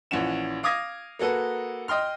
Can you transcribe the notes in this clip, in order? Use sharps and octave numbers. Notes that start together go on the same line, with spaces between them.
A#1 E3 C#4 F#5 E7
F5 D6 D#6 G#6 A#6
A#3 F#4 A4 B4
D#5 G5 C6 F6